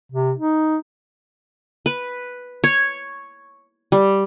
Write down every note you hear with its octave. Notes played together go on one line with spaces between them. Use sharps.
C3
D#4
B4
C#5
G3